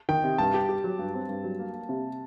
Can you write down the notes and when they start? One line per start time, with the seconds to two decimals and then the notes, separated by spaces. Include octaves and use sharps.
0.09 D#3 G5
0.24 C3
0.38 G2 A5
0.54 G4
0.69 G4
0.84 F#3
0.99 G2
1.14 C4
1.29 G2
1.44 F#3
1.59 A#3
1.74 A#3
1.89 C3